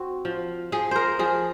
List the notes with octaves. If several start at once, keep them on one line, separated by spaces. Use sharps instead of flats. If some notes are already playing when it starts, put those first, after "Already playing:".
Already playing: C4 F#4
F3
F3 G#4
A#4 C5
F3 G#4